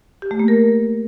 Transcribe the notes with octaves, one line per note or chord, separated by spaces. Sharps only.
G4
A3
A#3
A#4